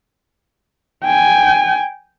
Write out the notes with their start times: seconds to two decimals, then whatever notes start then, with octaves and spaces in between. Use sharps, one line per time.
1.05 G5 G#5